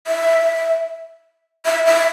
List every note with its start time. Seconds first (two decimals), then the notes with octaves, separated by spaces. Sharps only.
0.07 E5
1.66 E5
1.86 E5